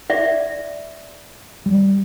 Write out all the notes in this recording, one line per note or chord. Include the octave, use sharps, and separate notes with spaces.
D5 E5
G3